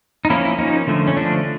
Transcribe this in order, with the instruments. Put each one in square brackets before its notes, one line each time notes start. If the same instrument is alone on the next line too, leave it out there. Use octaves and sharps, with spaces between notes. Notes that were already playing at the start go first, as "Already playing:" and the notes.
[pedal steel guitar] D#4
F3 A#3 C#4 E4
E4
F3 A#3 C#4 D#4
D3 F3 A3
C#4
D3 F3 A3 D4